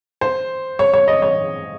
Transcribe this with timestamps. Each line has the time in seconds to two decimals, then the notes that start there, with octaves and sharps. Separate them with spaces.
0.21 C5
0.79 C#5
0.94 C#5
1.08 D#5
1.22 C#5